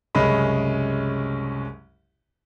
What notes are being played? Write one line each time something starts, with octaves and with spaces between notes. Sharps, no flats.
C2 F#2 C#3 G#3 C#4 B5